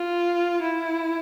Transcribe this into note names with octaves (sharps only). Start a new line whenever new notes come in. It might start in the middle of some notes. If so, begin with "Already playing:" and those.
Already playing: F4
E4